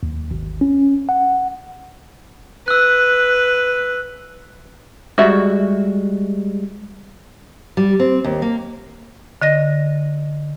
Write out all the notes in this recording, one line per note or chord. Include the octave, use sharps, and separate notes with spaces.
D#2
G#1
C#4
F#5
B4 E6 F#6
G3 G#3 F#4 E5
G3
C4
D#2
A#3
D3 D#5 A#6